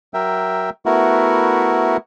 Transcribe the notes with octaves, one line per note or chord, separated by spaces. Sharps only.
F#3 A#4 E5 G5
A3 B3 E4 F#4 A#4